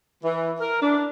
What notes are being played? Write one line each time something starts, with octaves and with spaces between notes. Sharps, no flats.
E3
A#4
D4